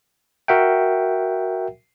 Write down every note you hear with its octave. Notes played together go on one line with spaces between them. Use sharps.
F#4 A#4 E5 F#5 G5